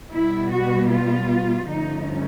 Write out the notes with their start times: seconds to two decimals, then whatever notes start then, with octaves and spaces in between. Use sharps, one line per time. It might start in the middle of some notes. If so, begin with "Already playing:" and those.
0.12 B2 G3 B3 E4
0.51 F#4
0.90 F4
1.69 G2 D3 F3 A3 C#4 D#4